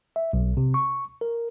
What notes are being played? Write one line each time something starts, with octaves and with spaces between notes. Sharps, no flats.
E5
B1
C3
C#6
A#4